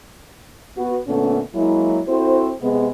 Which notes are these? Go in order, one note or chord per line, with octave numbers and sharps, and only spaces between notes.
B3 F#4
A#2 D3 A3 B3 C#4 A4
F#3 G#3 A#3 E4
C4 E4 F#4 A4 C5
C3 G#3 B3